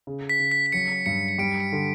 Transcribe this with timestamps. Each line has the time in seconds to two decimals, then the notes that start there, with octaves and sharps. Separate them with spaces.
0.07 C#3
0.29 B6
0.40 C#3
0.51 B6
0.66 B6
0.72 F#3 C#7
1.06 G2 C#7
1.28 C#7
1.38 G3 D7
1.60 C#7
1.73 D3